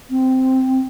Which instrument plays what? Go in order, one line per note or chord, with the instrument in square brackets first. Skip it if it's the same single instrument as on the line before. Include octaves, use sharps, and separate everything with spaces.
[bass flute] C4